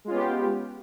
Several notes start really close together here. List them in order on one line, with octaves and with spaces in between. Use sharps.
G#3 F4 C#4 B3 G4